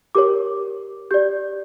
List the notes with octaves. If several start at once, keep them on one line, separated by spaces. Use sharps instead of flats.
G4 A#4 C#5 D6
G4 D5 G6